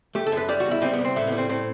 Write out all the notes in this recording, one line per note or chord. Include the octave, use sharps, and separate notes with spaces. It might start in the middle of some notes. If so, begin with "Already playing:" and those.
A3 G4
A4
F#2 B4
G3 D5
F#4
E2
E4
G3 C4
B3
C2
C4
A2 E4
G3 B3
C4
A2 C4